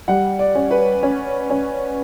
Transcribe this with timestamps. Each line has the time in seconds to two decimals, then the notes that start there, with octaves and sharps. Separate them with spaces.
0.08 G3 F#5
0.39 D5
0.55 C#4
0.71 B4
1.03 C#4
1.50 C#4